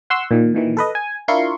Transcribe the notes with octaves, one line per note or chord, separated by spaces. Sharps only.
F#5 C6 C#6 E6
A#2 D#3
A#2 D#3 E3
A4 B4 D#5
G#5
D4 E4 F4 A#4 C6 C#6